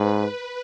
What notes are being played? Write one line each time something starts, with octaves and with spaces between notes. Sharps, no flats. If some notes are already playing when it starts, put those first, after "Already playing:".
Already playing: G#2 B4